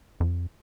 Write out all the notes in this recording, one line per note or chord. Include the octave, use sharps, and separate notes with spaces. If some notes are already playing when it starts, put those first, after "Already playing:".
F2